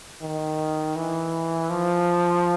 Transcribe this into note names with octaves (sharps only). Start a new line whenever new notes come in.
D#3
E3
F3